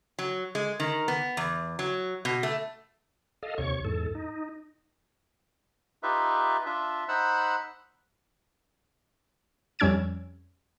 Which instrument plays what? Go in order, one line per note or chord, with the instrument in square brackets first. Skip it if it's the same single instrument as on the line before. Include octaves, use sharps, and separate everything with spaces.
[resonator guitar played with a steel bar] F#3
G#3
D#3
B3
E2
F#3
B2
A3
[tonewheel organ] A4 D#5 F5
D#2 C3 C#5 C#6
E2 G#2 A4
D#4
[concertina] D#4 F4 G4 B4 E5
D4 F4 E5
D#4 C5 F#5 B5 E6 F#6
[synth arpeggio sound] F2 G3 C#4 E6 G#6 D7